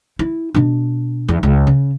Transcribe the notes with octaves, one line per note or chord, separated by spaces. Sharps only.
E4
B2 D4
E2
C#2
C#3